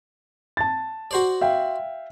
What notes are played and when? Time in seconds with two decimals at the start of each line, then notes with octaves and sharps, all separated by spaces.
0.57 A5 A6
1.11 F#4 C5 D5
1.41 E5 F5 G5